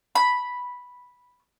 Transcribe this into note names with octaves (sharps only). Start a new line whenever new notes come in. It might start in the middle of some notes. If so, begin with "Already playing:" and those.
B5